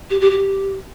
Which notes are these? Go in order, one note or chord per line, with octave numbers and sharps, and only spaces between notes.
G4
G4
G4